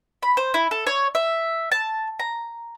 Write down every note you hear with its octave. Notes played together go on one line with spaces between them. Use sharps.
B5
C5
E4
A4
C#5
E5
A5
A#5